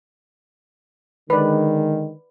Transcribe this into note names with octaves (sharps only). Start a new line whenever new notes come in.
D3 D#3 G#3 B4 D5